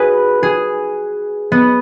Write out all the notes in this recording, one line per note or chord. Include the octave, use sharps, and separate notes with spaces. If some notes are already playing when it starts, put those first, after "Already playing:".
Already playing: F#4 G#4 B4
G#4
B3